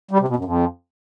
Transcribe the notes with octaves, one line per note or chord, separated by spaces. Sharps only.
G3
C3
B2
F#2
F2